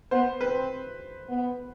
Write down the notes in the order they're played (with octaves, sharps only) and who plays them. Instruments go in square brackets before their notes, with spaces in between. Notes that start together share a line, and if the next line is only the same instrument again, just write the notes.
[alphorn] B3 [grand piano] C5
[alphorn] C4 [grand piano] B4
[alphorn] B3